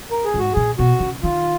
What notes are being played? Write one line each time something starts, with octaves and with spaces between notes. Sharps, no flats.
A#4
G#4
G#2 F#4
A#2 G#4
B2 F#4
C#3
D#3 F4